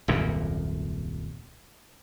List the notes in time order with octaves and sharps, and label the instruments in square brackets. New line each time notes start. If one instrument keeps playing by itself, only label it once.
[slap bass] D#1 C2 F#2 A#2